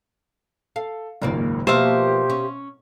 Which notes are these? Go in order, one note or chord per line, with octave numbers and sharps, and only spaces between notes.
A4 F5
F#1 C#2 G#2 D#3 A#3 D5
B2 F3 A#3 B3 G4 C5 E5 F5
C#4